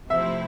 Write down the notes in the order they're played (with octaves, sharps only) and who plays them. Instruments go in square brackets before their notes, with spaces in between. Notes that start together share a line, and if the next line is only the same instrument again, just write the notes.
[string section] C3 F3 A3 C4 E4 [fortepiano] E5